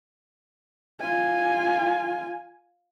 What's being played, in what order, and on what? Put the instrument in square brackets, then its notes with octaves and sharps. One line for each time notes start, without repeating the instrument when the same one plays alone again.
[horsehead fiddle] F4 G#5